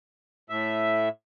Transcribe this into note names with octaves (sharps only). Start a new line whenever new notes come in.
A2 E5